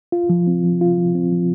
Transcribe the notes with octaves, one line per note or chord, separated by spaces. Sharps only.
F4
F3
C4
F3
F4
F3
C4
F3